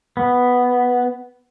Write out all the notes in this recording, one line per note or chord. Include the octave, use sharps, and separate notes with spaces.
B3